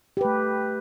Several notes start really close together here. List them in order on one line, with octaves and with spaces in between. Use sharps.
G4 B4 A3